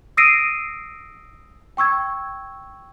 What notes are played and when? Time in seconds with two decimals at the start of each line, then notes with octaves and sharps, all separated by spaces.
0.17 D#6 E6 A#6 C7 D7 D#7
1.77 G5 C#6 E6 G#6